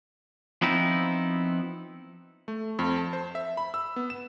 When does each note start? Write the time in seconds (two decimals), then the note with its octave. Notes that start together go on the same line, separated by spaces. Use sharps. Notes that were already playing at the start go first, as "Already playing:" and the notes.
0.62 F3 B3 C4 D#4 E4
2.48 A3
2.79 F2
2.97 A5
3.13 C5
3.35 E5
3.57 B5
3.74 E6
3.96 B3
4.10 E7